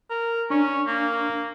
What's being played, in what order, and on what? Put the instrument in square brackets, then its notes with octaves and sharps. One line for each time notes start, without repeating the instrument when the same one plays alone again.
[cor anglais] A#4
[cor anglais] C#4 [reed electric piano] D4 C#6
[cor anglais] A#3